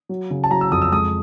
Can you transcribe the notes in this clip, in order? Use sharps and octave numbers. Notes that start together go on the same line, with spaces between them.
F#3
C#3
A5
F#3 A#5
E6
F2 D#6
E6
G#3 D#6